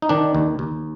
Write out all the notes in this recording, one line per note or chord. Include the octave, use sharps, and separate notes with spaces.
D#4
D#3 D4
D#2
D#2